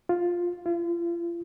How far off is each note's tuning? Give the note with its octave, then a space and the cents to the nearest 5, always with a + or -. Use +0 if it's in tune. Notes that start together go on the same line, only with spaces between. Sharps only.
F4 +5
F4 -40